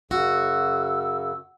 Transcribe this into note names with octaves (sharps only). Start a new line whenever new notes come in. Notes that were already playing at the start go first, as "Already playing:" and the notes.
F#2 C#3 F#4 E6